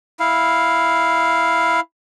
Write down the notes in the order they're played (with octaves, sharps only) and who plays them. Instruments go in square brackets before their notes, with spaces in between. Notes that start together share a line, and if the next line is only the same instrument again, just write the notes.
[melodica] E4 F5